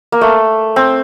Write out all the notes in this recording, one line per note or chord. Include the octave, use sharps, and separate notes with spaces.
A#3
A3
C4